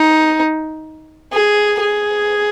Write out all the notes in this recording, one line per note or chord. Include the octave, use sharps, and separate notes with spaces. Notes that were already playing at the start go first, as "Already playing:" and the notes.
Already playing: D#4
G#4
G#4